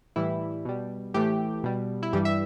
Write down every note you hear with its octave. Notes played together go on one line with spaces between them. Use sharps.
A2 E3 G3 E4
B2 G3
A2 E3 A3 G4
B2 G3
E4
G2 E3 G3 G4
E5